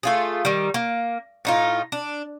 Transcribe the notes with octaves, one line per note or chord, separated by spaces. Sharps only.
A3 F4 G#4
D#3 G3
A#3
A2 D#4 F4
D4